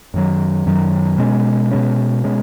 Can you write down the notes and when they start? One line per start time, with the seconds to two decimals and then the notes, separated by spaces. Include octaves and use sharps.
0.14 F#2 D#3 F#3
0.66 F#2 D#3 F#3
1.19 B2 G#3 C#4
1.71 B2 G#3 C#4
2.24 B2 G#3 C#4